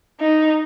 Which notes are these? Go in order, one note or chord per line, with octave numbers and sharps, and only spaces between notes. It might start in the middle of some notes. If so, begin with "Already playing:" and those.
D#4